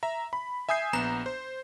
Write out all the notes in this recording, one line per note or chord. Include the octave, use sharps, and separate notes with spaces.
E5 A#5
B5
E5 G#5 D#6 G6 C7
A#1 B3 A#5 E7
C5